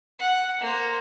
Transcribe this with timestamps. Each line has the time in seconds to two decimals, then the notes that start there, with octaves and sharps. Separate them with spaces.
0.19 F#5
0.61 A#3 C5